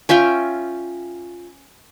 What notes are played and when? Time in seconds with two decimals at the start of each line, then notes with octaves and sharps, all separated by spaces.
0.09 C#4 F4 E5 G5